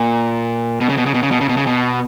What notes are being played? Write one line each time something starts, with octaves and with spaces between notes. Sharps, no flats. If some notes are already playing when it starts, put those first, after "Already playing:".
Already playing: A#2
B2
C#3
B2
C#3
B2
C#3
B2
C#3
B2
C#3
B2